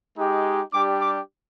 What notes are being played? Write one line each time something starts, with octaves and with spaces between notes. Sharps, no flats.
G#3 D#4 G4
G3 D4 G4 D6
D6